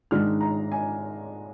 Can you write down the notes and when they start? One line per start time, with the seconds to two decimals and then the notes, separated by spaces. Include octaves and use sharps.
0.11 G#2 D#3 G#3 D4 F6
0.41 A#5
0.72 G#5